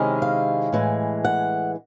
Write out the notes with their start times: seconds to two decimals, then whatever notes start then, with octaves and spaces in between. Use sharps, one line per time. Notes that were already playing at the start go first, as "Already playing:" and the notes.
Already playing: C3 D#3 G#3 C#4 E4
0.22 F5
0.72 A2 E3 G#3
1.25 F#5